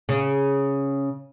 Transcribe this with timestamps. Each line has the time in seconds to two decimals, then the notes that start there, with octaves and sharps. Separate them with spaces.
0.09 C#3